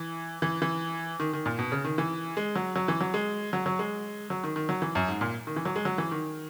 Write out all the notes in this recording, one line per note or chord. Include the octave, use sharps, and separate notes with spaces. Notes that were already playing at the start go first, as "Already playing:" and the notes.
Already playing: E3
E3
E3
D#3
D#3
A#2
B2
C#3
D#3
E3
G#3
F#3
F#3
E3
F#3
G#3
F#3
F#3
G#3
F#3
D#3
D#3
F#3
E3
F#2
G#2
A#2
D#3
E3
F#3
G#3
F#3
E3
D#3